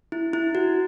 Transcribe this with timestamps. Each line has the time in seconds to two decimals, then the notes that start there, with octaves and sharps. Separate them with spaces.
0.12 E4
0.33 E4
0.55 F#4